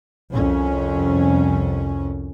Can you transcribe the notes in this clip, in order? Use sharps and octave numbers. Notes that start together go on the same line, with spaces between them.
C2 F2 C#4